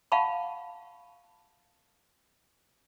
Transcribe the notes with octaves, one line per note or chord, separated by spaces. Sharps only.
F5 F#5 A5 B5 C#6